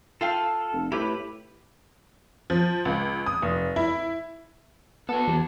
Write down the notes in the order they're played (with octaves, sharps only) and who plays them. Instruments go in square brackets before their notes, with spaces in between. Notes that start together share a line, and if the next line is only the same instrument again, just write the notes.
[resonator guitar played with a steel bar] F4 F5 G5 [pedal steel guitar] A4
[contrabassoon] F1
[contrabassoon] A2 [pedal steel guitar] E4 B4 B5 [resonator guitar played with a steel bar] G4
[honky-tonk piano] F3
C#2
D#6
F1
E4
[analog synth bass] B3 [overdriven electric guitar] F#4 A4
[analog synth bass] E2